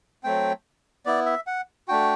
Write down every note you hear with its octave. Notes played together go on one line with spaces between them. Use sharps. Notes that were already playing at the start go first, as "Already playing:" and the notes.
F#3 A3 C4 G5
B3 E4 D5
E5
F#5
A3 D4 F#4 G5